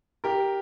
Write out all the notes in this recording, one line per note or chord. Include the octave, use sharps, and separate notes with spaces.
G4 A#4